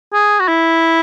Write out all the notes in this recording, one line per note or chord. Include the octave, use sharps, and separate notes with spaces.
G#4
F#4
E4